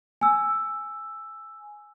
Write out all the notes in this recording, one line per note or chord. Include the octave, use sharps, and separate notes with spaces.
G#5 E6